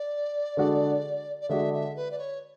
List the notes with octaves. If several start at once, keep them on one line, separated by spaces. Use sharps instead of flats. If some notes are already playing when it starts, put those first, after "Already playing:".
Already playing: D5
D3 G#3 D4 F#4
D5
D3 G#3 D4 F#4 E5
E5
B4
D5
C#5